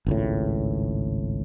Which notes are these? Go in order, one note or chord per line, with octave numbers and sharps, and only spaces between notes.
G#1 C#2 A2